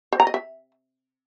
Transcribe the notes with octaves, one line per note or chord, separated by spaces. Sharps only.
C5
A#5
D#5
E5